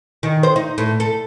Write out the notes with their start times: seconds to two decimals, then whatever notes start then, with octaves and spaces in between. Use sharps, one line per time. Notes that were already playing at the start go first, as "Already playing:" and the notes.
0.23 D#3
0.43 C5
0.56 D#4
0.78 A2
1.00 A4